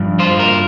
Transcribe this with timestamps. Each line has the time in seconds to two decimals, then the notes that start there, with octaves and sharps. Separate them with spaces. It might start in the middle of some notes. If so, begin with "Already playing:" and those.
Already playing: G2 F3
0.19 F4 C5
0.39 A#4